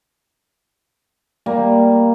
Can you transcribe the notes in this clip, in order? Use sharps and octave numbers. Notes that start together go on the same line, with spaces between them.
G3 A#3